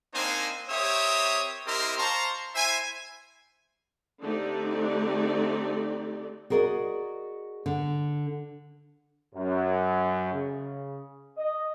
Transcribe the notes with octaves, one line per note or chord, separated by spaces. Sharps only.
A#3 C4 D4 D#4 C5 G#5
C4 G4 A#4 C#5 E5 D#6
C4 E4 G4 A#4 D#5 C6
C5 F5 A5 A#5 C6 C#6
E4 C5 E5 G#5
D3 A3 C4 D#4 G4 D5
F#4 G#4 A#4 D5 D#5
D3
F#2
C#3
D#5